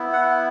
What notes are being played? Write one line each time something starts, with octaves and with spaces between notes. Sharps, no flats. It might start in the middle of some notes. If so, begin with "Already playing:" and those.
Already playing: B3 E4
F#5